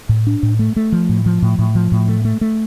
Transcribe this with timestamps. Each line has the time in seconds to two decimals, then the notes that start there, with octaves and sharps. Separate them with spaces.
0.09 A2
0.27 D4
0.43 A2
0.59 A3
0.76 A3
0.92 F3
1.09 A2
1.26 F3
1.42 A2
1.59 A2
1.75 F3
1.92 A2
2.08 A3
2.25 A3
2.41 A3